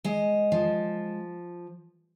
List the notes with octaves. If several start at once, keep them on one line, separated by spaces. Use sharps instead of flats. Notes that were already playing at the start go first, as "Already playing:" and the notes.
G#3 D#5
F3